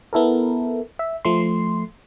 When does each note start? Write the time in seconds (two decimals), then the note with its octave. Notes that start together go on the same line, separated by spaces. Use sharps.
0.13 B3 E4 A4 A#4
0.99 E5
1.25 F3 A3 C6